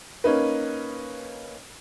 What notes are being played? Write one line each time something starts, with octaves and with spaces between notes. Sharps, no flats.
A#3 C#4 D#4 B4